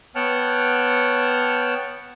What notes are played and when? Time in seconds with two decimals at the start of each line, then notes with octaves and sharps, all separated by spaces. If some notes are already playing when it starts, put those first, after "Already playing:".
0.15 B3 C#5 F#5 G5 A5 F6